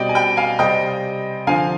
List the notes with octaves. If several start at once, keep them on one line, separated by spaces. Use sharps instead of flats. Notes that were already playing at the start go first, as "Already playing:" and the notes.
Already playing: B2 G3 C4 D5 D#5 G5
G#5
G5 B5
F5 G#5
C3 G3 C4 D#5 G5
D3 F3 C4 F5 G#5